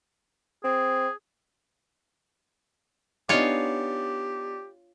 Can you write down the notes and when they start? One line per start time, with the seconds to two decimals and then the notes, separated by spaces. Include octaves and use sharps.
0.64 C4 G#4
3.29 B3 D4 D#4 F4 G4 C#5 G#5